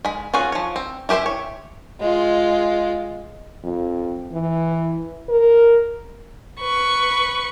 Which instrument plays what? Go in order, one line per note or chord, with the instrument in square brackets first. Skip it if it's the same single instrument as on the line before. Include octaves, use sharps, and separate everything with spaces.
[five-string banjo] G#3 B5
C#4 F4 F#4 G#4
F3 C#5
C4
E4 G4 B4 C5 E5
C#5
[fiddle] G#3 F4
[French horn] F2
E3
A#4
[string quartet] B4 C#6